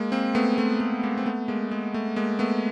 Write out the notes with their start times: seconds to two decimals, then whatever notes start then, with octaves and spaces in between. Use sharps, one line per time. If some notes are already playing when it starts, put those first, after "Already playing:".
Already playing: G#3 A#3
0.12 A#3 C4
0.35 A3 B3
0.58 A3
0.80 A3
1.03 G#3 A#3
1.17 C4
1.26 A3 B3
1.48 G#3 A#3
1.71 G#3
1.94 A3
2.16 G#3 A#3
2.39 A3 B3